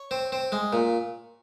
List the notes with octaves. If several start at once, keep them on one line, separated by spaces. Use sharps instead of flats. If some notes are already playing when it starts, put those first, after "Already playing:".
Already playing: C#5
C4
C4
G#3
A#2